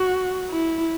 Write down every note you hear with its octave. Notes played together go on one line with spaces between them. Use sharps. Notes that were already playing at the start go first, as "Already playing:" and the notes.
Already playing: F#4
E4